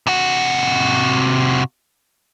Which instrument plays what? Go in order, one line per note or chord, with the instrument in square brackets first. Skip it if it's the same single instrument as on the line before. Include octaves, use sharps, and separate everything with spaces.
[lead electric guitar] C3 F#4